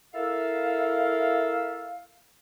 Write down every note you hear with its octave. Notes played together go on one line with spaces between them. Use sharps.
E4 A4 A#4 E5 F5